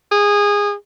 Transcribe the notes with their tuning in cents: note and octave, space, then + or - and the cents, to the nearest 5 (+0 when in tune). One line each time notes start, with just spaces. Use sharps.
G#4 -20